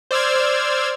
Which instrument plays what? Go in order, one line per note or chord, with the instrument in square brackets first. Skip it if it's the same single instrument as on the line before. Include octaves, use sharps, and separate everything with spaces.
[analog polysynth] C5 D5 E6 F6 G#6